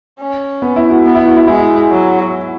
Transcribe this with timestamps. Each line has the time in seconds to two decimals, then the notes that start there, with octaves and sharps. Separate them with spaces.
0.19 C#4
0.62 B3
0.76 E4
0.90 F#4
1.05 B3
1.15 E4
1.26 F#4
1.37 E4
1.47 G#3 E4
1.90 F#3